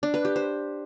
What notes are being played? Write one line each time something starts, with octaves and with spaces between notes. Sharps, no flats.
D4
B4
G4
C5